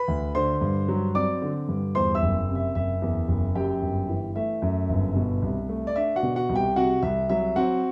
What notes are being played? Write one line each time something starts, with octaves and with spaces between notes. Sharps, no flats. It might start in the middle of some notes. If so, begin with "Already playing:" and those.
Already playing: B4 B5
D2
D3 C5 C6
G2
F#3
C4 D5 D6
D3
G2
E2 C5 C6
E5 E6
F#1
C3
E5
F#1 E5
E2
F#1
F#2 G4 G5
G1
E3
A3 E5
F#2
G1
B2
C2
A3
D5
D4 E5
F#4 F#5
B2
F#4 F#5
C2
G4 G5
C3 F#4 F#5
C2 E5
F#3 E5
C4 F#4 F#5